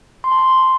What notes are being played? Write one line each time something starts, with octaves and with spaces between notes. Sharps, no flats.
C6
A5
C6